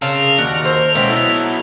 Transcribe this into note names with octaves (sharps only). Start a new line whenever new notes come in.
C#3 A#4 A5 C6 E6
D#2 F#4 D5
A4 C5
C#2 B2 C5 E5 G5
F#3 B3 E4 A4